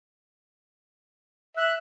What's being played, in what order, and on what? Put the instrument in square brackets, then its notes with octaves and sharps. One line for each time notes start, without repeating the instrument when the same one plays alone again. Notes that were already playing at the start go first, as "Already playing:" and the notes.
[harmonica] E5 [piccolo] F#6